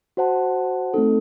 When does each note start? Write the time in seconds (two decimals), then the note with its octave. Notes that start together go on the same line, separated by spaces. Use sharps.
0.17 F#4 C5 F#5 A5
0.94 A3 C4 D#4 A4